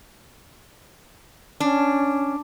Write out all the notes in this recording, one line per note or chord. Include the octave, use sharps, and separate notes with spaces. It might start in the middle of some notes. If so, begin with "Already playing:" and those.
C#4 D4